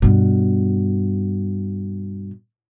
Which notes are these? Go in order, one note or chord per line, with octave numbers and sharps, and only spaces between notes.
G2 B2